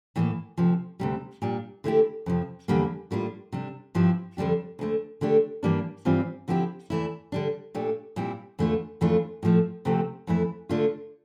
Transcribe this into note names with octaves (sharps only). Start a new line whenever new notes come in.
A2 E3 G3 A#3
D2 C3 F3
D2 C3 G3
A#2 G3 D4
D3 A3 E4 G4
F2 C3 F3
E2 D3 G3 A#3
A2 G3 A#3 D4 F4
C3 G3 D4
G2 F3 C4 E4 G4
F2 D3 G3 D4 G4
D2 D3 A3
D3 A3 D4 G4
G2 E3 G3 A#3 D4
G2 E3 G3 C4 F4
D3 F3 C4 E4 G4
E2 E3 A3 E4
D3 G3 D4
A#2 A3 D4 G4
A#2 G3 C4 E4
E2 D3 A3 D4 F4
F2 E3 A3 D4 F4
A2 F3 A3
D2 C3 F3 A3 C4
F2 E3 A3 E4
D3 A3 D4 F4